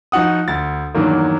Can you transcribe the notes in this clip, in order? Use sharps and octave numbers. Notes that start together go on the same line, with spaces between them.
F3 D#4 F#4 F#5 D#6
D2 A6
E2 G2 D#3 F#3 A#3